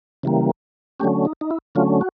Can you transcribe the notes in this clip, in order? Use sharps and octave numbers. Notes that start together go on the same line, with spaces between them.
C#3 E3 G3 A#3
D3 F#3 A3 C#4 G4
D#4
D#4
E4
D3 F#3 A3 C#4 F4
F#4